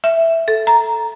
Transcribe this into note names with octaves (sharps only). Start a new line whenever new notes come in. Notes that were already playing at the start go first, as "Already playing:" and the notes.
E5
A4
A#5